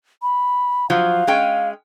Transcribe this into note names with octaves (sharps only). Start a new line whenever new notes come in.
B5
F3 F#3 F5
G#3 C#4 G5